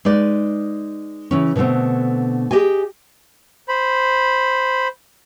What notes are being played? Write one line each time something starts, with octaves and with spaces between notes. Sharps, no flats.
G#3 D#4 B4 D5
C#3 E3 C#4
B2 D3 A3 B3 C4
G4 G#4 D#5 G#5
C5 B5